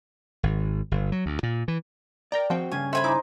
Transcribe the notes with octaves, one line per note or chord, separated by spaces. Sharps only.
G#1
G1
F#3
D2
A#2
E3
A#4 D5 G5 A#5
F3 C4 F#4 G5
G2 C#3 C#4 G#5
A4 C5 E5 G#5 B5
D#4 E4 D6